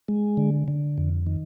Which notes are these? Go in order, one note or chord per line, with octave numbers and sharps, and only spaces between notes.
G#3
D3
D3
F2
D#3